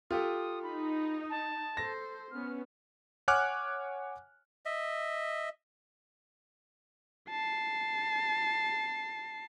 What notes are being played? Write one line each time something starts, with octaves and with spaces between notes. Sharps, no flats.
F4 G4 A4 D#6
D#4 B5
A5
A4 C5 A#6
B3 C#4 F6
C#5 F#5 G#5 D6 F6 F#6
D#5 E5
A5 C7